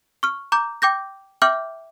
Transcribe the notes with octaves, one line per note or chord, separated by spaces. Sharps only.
C#6 F6
A#5 D6 G6
G5 D6 G6 A#6
E5 G5 D6 F6 G6 F#7